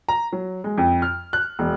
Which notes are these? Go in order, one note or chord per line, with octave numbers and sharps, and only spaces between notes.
A#5
F#3
G#3
F2
F6
F#6
E1